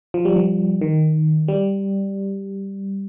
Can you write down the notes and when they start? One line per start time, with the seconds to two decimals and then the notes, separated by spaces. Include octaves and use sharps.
0.14 F3
0.25 G3
0.36 F3
0.81 D#3
1.48 G3